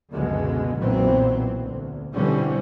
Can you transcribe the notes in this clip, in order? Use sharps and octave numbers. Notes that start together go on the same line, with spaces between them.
F#1 C#2 B2 D3 G#3
B1 A#2 E3 F#3 B3 C4
D2
B2 D3 E3 G3 C4 C#4